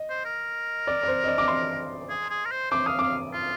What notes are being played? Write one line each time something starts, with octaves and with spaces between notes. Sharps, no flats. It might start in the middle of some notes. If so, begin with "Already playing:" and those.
Already playing: D#5
C5
A#4
D5
D5
C5
D#5
D5
D6
C6
G#4
G#4
A#4
C5
C5 D6
F5 D#6
F5 D6
F4